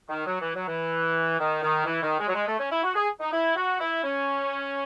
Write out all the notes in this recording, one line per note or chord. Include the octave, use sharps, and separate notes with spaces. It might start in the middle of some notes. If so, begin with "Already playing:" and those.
D#3
F#3
E3
F#3
E3
D#3
D#3
E3
D#3
G#3
F#3
G#3
A3
C#4
E4
F#4
G#4
D#4
E4
F#4
E4
C#4